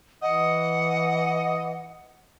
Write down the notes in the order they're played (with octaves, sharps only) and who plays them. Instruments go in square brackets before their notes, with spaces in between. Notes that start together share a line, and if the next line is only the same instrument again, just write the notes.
[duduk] E3 [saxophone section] D#5 [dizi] F#5